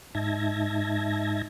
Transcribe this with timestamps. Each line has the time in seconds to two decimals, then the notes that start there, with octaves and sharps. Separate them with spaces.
0.15 G#2 D#4 E5 A5 G#6 A#6